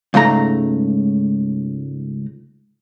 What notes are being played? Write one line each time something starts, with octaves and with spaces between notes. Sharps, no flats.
C#2 G#2 A3 A#5